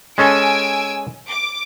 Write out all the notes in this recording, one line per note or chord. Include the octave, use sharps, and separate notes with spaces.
G#3 C#4 A4 G#5 E6 D7
D6